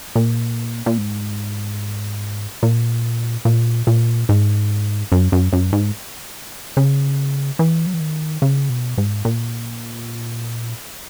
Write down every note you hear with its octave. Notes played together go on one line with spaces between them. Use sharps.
A#2
A#2
G#2
A#2
A#2
A#2
G#2
F#2
F#2
F#2
G#2
C#3
E3
F#3
E3
D#3
C#3
B2
G#2
A#2